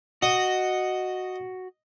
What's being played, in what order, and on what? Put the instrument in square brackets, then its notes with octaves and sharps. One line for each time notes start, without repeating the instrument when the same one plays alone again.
[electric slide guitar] F#4 [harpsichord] D#5